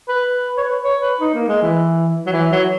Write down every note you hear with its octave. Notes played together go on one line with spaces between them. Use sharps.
B4
C#5
B4
C#5
B4
D#4
A#3
G#3
E3
F#3
E3
F#3